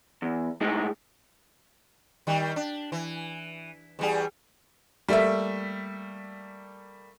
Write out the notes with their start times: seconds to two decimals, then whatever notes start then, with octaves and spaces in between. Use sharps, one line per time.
0.22 E2
0.61 A2 G#3 D#4
2.27 D#3 G3
2.56 D4
2.92 E3
3.99 E2 G3 G#4
5.09 G3 A3 A#3 E5